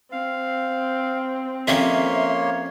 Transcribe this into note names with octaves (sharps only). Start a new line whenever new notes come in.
C4 F5
F2 A#3 C#4 G4 C#5 E5 C6